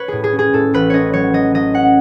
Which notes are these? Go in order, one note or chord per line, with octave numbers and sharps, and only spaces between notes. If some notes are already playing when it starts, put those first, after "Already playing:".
Already playing: B4 C#5
A2 G#4
G#4
C#4
G#4
A2 A4
A1 B4
C#4 C#5 D#5
F#3 C#5
F#3 D#5
F#3 D#5
C#4 F#5